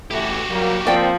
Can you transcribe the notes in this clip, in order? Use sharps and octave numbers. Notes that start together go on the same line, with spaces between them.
A1 E3 A3 F#4 G4
F#3 G3 A#3
F3 A#3 C4 D5 G5